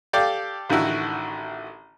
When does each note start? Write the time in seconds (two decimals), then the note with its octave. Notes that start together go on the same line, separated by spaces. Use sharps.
0.13 G4 A4 D5 F5 D6
0.70 A1 D3 D#3 E4 F#4